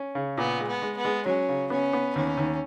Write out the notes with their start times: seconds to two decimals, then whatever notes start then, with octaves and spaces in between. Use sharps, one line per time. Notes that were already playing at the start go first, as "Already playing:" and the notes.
Already playing: C#4
0.15 C#3
0.38 A#2 B3
0.60 G#3
0.67 B3
0.82 G#3
0.97 B3
1.05 G#3
1.26 F#3 C#4
1.49 C#3
1.70 B3 C#4
1.93 B3
2.15 D#2 C#4
2.37 D#2